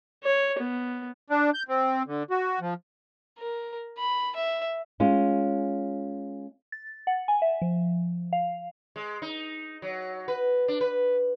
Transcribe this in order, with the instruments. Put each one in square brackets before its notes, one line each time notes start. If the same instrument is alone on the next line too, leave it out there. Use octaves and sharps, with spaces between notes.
[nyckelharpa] C#5
B3
[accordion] D4
G6
C4
D3
F#4
F3
[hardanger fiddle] A#4
B5
E5
[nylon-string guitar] G#3 C#4 F4
[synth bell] A6
F#5
G#5
E5
F3
F5
[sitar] G#3
D#4
F#3
B4
D4
B4